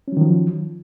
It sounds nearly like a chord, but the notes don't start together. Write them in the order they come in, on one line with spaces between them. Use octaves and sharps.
C#4 F#3 D#3 F3